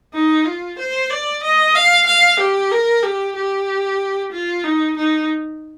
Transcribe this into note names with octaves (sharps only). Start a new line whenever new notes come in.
D#4
F4
C5
D5
D#5
F5
F5
G4
A#4
G4
G4
F4
D#4
D#4